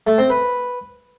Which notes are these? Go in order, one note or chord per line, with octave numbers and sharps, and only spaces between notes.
A3
C4
B4